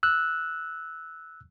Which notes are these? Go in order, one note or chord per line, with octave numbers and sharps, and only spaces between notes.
E6 F#6